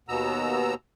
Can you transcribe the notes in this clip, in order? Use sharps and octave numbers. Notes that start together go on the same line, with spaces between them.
D#2 B2 B3 A#5 E6